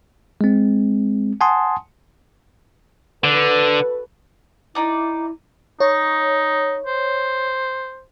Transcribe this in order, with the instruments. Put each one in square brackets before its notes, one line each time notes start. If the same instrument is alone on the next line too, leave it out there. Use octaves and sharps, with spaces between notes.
[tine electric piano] G#3 C4
F#5 G#5 A5 C6 D#6
[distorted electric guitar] D3 [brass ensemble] F#4 A4 B4
[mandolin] D#4 D5 [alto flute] E4
[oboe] D#4 [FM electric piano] C#5
[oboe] C5